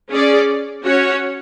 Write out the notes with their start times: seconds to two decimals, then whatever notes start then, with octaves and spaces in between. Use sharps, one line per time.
0.11 C#4 G#4 D5
0.85 C#4 F#4 C#5